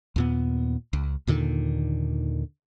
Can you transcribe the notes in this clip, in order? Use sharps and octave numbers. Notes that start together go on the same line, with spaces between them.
D#2 A#2 B3
C#2
D#2 A#2 D3 D#3